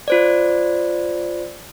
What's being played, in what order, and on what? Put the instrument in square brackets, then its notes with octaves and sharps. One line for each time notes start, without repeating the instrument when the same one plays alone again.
[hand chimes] F4 C5 D5